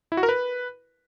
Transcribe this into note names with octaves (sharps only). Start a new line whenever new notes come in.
E4
F#4
A#4
B4